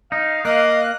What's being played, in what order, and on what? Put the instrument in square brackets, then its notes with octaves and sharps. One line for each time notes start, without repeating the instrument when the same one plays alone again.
[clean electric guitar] D#4 [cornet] F5
[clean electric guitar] A#3 [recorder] D#5 [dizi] F#6